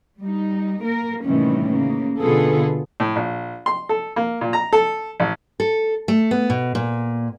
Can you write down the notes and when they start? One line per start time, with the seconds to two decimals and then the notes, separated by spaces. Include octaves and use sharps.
0.21 G3 D#4
0.83 A#3 A#4
1.25 A2 C3 D#3 E3 G3 C#4
1.71 C#3 A#3
2.20 B2 D3 B3 F4 G#4 A4
3.00 A2
3.16 A#1
3.66 C6
3.89 A4
4.16 A#3
4.41 A#2
4.53 A#5
4.73 A4
5.20 A1
5.60 A4
6.08 A3
6.31 B3
6.50 B2
6.75 A#2